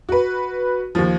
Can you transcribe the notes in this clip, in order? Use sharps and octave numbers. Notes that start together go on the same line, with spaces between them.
F#4 B4
D#2 F3